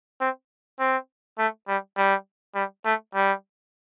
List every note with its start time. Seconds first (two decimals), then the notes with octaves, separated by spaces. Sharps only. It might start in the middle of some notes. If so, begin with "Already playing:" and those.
0.21 C4
0.79 C4
1.38 A3
1.68 G3
1.97 G3
2.55 G3
2.85 A3
3.14 G3